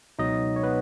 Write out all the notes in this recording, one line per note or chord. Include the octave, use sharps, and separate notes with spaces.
C#2 B2 F#3 D#4 D#5
C#5
B3 B4